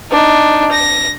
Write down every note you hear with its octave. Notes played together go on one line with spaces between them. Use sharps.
D4 D#4
A#6